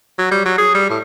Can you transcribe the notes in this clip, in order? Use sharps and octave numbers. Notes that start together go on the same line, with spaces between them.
F#3
G3
F#3
G#4
G3
A2